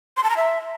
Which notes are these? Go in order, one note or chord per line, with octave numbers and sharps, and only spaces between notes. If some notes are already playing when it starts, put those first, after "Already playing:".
C6
A5
A#5
E5